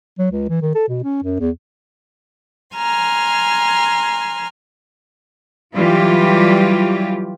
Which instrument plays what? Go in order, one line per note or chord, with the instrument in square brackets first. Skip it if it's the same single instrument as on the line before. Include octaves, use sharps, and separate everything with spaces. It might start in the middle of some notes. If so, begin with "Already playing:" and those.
[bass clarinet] F#3
C#2
E3
D#3
A4
B2
C#4
F#2
E2
[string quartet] G#5 A#5 C6 F6
[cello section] E3 F#3 G3 F4 G4